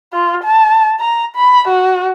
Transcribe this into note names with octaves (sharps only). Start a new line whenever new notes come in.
F4
A5
A#5
B5
F#4